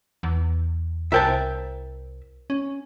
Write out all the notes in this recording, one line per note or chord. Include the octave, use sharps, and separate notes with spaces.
E2
C2 E4 A#4 C5 E5 G5 A5
C#4